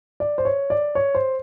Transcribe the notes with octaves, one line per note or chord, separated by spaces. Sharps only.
D5
C5
C#5
D5
C#5
C5